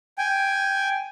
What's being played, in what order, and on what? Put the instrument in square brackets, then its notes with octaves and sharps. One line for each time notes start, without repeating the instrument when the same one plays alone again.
[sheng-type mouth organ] G5 G#5